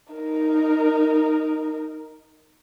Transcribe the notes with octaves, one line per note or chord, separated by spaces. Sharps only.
D#4 A#4